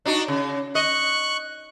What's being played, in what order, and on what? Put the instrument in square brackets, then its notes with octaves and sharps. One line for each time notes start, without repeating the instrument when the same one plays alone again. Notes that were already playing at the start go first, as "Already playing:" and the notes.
[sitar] D4 D#4 F#4
C#3
[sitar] D#5 [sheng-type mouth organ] C#6 F#6